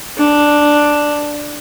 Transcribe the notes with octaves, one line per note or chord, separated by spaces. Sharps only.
D4